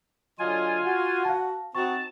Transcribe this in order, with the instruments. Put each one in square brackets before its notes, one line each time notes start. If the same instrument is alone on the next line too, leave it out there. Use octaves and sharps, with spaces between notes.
[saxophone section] D3 F#3 D#5 [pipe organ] F4 G#5
[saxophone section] F#4
[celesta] F5 A5
[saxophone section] C4 D#4 F#4 [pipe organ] A5 [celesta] C#6